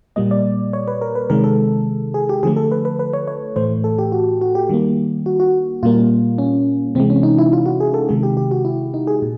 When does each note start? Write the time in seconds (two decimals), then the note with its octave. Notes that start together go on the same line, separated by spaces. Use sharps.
0.16 A#2 G3 A#3 D#5
0.31 D5
0.73 C#5
0.88 B4
1.02 A#4
1.15 B4
1.30 C3 D#3 G#3 A#4
1.44 A4
2.14 G#4
2.29 G4
2.43 D3 F3 A3 G#4
2.56 A4
2.72 B4
2.85 B4
2.99 B4
3.13 C#5
3.28 C#5
3.56 A2 E3 A3 C5
3.84 A4
3.98 G4
4.12 F#4
4.41 F#4
4.55 G4
4.69 D#3 G3 A#3
5.26 F#4
5.40 F#4
5.83 A#2 G3 A#3 F4
6.38 C#4
6.95 C3 E3 G#3 C4
7.10 C#4
7.23 D#4
7.38 E4
7.53 F4
7.66 F#4
7.80 G#4
7.94 A4
8.09 C3 D#3 G#3 G#4
8.23 G4
8.37 G4
8.51 F#4
8.65 E4
8.94 D#4
9.07 G#4
9.22 A#2